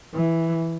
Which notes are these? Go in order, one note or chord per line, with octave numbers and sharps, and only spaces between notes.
E3